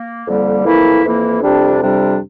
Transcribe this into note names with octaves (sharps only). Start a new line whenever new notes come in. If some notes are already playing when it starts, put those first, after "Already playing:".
Already playing: A#3
F2 D3 G3 A#3
F2 E3 A#3 E4
F2 E3 A#3 E4
F2 C3 G3 D4
F2 C3 G3 D4